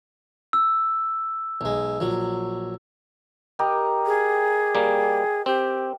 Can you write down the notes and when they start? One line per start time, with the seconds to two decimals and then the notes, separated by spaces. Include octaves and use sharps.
0.53 E6
1.61 B1 G#3
2.00 A#1 F#3
3.59 G4 A#4 D#5
4.06 G#4
4.75 G3 A#3
5.46 C4 G4